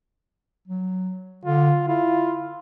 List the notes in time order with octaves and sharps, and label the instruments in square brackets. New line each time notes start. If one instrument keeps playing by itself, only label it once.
[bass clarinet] F#3
[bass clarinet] D3 [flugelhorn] F4
[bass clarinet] E4 [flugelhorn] F4